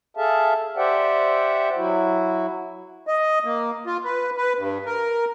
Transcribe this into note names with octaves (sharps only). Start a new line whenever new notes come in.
G#4 A4 E5 F5 A5
G4 C5 D5 E5 F#5 G5
F#3 E4 F#4
D#5
A#3
F4
B4
B4
G2
A#4